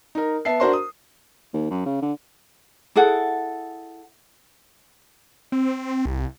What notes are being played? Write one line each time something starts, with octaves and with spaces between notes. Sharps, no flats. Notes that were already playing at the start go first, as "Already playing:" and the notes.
D#4 A#4
B3 E5 A5 C7
D4 F#4 A#4 C5 A#5 C6
D#6
D#2
F#2
C#3
D3
E4 G#4 A4 F#5
C4
C2